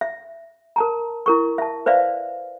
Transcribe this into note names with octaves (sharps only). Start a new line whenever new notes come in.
E5
A#4 A5 A#5
E4 A#4 C#6
E5 A5
B4 C5 D5 E5 F5